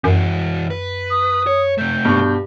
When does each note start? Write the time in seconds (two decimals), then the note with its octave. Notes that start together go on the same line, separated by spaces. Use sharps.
0.04 F#2 E3 F#4
0.70 B4
1.10 D#6
1.47 C#5
1.78 C3 A3 G6
2.05 G2 B2 C#6